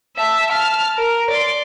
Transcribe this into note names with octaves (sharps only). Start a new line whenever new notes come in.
E5 A5
A5 F6
A#4
D5 C6